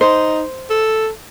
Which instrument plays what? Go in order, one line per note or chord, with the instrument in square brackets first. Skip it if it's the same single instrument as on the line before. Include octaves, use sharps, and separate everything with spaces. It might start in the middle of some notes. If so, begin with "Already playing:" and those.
[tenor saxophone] D#4 [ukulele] C5
[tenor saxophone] A4